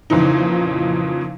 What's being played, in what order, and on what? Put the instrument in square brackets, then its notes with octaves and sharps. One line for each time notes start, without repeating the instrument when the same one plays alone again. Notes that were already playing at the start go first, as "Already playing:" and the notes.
[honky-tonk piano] F2 A#2 C#3 E3 D#4